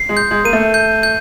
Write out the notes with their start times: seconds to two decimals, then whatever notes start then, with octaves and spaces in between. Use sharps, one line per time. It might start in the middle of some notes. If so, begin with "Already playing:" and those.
Already playing: C7
0.09 G#3
0.17 G6
0.31 G#3
0.45 A#3 D#7
0.53 A3
0.74 G6
1.03 G6